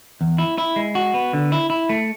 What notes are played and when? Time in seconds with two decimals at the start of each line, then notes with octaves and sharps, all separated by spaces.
0.21 E2
0.38 E4
0.58 E4
0.76 G#3
0.95 F#4
1.14 B3
1.33 D3
1.52 E4
1.70 E4
1.89 A3